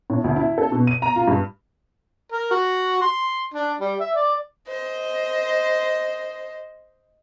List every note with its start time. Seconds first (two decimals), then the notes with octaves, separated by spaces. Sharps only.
0.10 A2
0.24 D2
0.36 E4
0.58 A4
0.72 B2
0.87 D#7
1.02 A#5
1.16 F4
1.28 G2
2.32 A#4
2.51 F#4
3.02 C6
3.54 D4
3.80 G3
4.00 E5
4.15 D5
4.67 C5 D#5